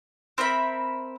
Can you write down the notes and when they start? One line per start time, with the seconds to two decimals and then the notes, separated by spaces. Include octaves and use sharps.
0.38 C4 A#4 E5 B5